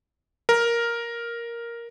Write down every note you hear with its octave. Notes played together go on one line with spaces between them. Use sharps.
A#4